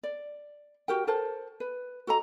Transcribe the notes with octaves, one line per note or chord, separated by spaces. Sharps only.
D5
F#4 G4 A#4 G5
A4 A#4 C5 A5
B4
F#4 A4 D#5 A#5